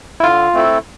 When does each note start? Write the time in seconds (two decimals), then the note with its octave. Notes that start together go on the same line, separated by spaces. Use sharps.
0.20 E4
0.24 D3 F4
0.54 A3 C4 E4 A4